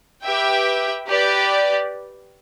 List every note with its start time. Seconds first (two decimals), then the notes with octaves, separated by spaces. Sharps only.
0.23 G4 B4 E5 G5
1.06 G4 B4 D5